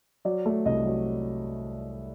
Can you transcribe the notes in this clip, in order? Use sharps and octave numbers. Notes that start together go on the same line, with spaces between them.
F#3 D5
A3
C2 D#5
F#3